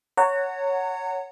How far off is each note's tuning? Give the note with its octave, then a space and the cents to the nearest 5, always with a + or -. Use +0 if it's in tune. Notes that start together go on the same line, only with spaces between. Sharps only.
C#5 +5 F#5 +0 A#5 -35